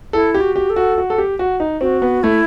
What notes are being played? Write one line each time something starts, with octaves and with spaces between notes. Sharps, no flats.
E4 A4
G4
F#4
G4
A4
F#4
F#4
A4
G4
F#4
D#4
C4 F#4
B3
A3 E4